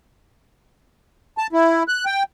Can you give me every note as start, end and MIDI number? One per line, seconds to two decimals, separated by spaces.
1.38 1.47 81
1.53 1.83 64
1.88 2.05 90
2.06 2.23 79